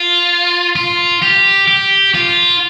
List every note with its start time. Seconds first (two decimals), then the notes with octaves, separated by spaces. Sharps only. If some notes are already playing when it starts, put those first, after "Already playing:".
Already playing: F4
0.76 F4
1.22 G4
1.68 G4
2.15 F4